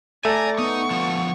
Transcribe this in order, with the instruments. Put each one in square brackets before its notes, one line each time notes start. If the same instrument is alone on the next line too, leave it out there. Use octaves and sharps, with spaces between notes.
[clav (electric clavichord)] A3 [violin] D5 A#5 [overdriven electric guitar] G#5
[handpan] B3 [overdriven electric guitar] D#4 [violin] C#6
[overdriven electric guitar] D3 F3